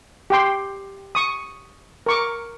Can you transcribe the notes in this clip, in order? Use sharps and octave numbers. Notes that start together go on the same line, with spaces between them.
G4 G5 C6
C#6 D#6
A#4 C#6 D6